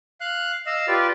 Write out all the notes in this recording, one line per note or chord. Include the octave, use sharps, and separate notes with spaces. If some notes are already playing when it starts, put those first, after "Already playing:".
F5 F#6
D#5 F5 E6
F4 G4 B4 D5